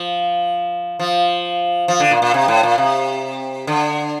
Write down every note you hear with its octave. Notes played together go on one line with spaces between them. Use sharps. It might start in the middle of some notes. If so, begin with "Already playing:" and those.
Already playing: F3
F3
F3
D3
A#2
A#2
C3
A2
A#2
C3
D3